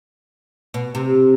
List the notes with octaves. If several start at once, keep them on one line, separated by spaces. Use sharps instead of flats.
B2
C3